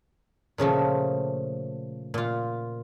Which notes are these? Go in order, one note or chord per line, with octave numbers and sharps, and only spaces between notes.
A#2 C#3 F3 A3
A#2 F4